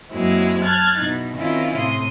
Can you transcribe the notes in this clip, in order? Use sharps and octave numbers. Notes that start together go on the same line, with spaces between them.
F#2 F#3 G#3 A#3 C4 E4
A5 F6 F#6 G#6 A6
B2 D#4 E4
D#3 C4 C#4 E4 F4
A2 C3 C6 D#6